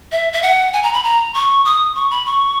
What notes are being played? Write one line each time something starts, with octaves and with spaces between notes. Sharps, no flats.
E5
E5
F#5
G#5
A#5
B5
A#5
C#6
D#6
C#6
B5
C#6